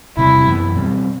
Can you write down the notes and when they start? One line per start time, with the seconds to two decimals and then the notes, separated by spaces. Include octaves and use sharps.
0.17 E2 C3 G3 E4
0.46 F#2 E3 B3
0.75 B2 G3 C4